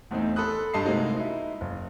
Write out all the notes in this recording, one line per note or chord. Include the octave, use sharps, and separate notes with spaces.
E2 A2 C4 D#4
A4 B5 C6 D#6 F#6
G2 G3 D#5 A5 C6 C7
A2 C3 G#3 A#3 D#4 F#4
D#4 E4
F#1